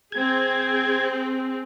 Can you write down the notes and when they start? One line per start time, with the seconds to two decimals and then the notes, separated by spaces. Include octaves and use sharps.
0.12 C4 G#4 G#6